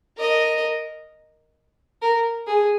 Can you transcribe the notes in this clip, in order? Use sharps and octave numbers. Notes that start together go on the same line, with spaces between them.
A#4 D#5
A#4
G#4